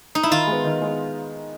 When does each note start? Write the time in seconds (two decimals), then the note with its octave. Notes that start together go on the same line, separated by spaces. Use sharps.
0.15 D#4
0.23 E4
0.31 D#3 F4
0.47 G#3 B3
0.64 D#3
0.82 G#3 B3